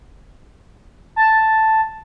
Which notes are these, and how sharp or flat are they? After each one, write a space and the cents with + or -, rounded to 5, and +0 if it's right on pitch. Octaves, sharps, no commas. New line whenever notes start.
A5 +0